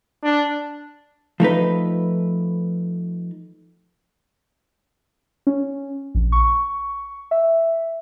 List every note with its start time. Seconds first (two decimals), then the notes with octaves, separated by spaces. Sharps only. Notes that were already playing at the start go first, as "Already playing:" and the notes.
0.24 D4
1.40 F3 A3 D#4 B4
5.47 C#4
6.15 A#1
6.32 C#6
7.31 E5